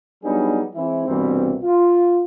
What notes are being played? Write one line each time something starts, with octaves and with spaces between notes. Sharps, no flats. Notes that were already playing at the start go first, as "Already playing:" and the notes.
F#3 G3 B3 D4 D#4 G#4
E3 G#3 C4 E4
C2 G2 B2 E3 G3 C4
F4